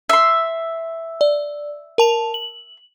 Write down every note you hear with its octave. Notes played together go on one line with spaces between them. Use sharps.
E5 C6
D5
A#4 A5 F7
F#7